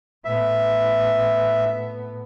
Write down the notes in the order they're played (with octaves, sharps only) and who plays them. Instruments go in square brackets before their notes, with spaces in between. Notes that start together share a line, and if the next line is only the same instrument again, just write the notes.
[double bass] A2 B3 [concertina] E5